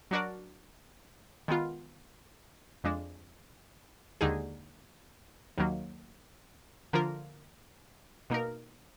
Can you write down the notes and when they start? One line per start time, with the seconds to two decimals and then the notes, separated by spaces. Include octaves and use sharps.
0.11 F#3 D4 F#4 A#4 D5
1.48 D#3 G#3 B3 F4
2.84 F2 F3 G#3 D4
4.21 D#2 D3 G#3 D#4 G#4
5.58 D#2 D#3 F#3 A#3
6.93 D3 F3 A#3 F4 A#4
8.30 B2 A#3 D#4 A#4